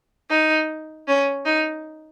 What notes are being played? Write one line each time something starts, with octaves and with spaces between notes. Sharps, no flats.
D#4
C#4
D#4